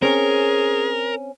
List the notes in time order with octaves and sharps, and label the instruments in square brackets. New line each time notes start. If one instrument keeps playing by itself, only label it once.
[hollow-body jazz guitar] C4 C#4 [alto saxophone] G#4 [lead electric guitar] A#4